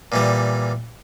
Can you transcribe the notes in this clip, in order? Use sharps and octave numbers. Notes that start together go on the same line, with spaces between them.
A#2 E3 G3